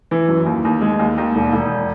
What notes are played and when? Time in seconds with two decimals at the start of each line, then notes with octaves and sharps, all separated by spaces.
0.11 E3
0.29 F#2
0.46 D#2
0.65 D#2
0.81 G#3
0.99 D#2
1.18 D#2
1.35 E1
1.53 E1